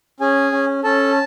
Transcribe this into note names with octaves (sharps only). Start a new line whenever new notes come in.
C#4 G#4 G#5
C#4
C#4 A4 A5